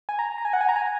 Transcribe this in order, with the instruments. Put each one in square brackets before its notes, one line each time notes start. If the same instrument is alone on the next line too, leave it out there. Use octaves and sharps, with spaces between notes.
[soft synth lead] G#5
A#5
A#5
G#5
F#5
G#5
A#5
G#5